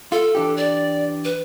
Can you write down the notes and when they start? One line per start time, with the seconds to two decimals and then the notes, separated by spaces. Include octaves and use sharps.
0.12 F4 A4
0.35 E3 D4 G4
0.57 D5
1.25 B4